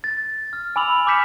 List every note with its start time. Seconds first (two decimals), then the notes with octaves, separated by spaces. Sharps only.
0.04 A6
0.53 F6
0.76 G#5 B5 D6 E6 F7 F#7
1.07 D6 F6 G6 B6 C#7 E7